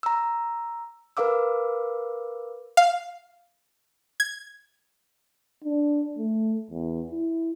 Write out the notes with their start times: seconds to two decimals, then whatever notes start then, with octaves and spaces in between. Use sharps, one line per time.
0.03 A#5 E6
1.17 A#4 B4 F5 D6 E6
2.77 F5
4.20 G#6
5.64 D4
6.18 A3
6.70 E2
7.11 E4